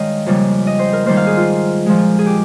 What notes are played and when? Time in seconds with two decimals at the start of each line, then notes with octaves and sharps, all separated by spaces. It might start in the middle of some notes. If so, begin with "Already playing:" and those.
Already playing: G2 D#3 G#3 C#5 D#5 F5 G5
0.26 F2 C#3 G3 A#3
0.67 D#5
0.79 C5
0.93 A#4
1.06 G#2 D#3 G3 A#3 C5
1.16 F5
1.27 G#4
1.37 F4
1.86 A#2 F3 G#3
2.19 G#4
2.26 G4